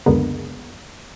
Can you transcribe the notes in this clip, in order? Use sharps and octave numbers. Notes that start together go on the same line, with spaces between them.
C#2 F#2 D3 G#3 A#3 B3